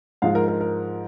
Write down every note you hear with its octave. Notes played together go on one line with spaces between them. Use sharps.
G#2 F3 G#3 F5
A#4
A#4
A#4